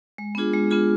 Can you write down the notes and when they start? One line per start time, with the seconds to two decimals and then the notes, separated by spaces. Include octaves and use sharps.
0.18 G#3
0.35 B3 D4 F4 G#4
0.53 G#3
0.71 B3 D4 F4 G#4